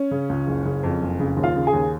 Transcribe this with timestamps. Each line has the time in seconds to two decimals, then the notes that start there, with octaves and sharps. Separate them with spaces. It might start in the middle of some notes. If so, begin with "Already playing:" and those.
Already playing: C#4 C#5
0.11 C#3
0.29 C#2
0.47 F#1
0.65 C#3
0.83 F2
1.02 F#1
1.20 C#3
1.37 D#2
1.43 F4 F5
1.56 C#3
1.67 G#4 G#5
1.73 D#2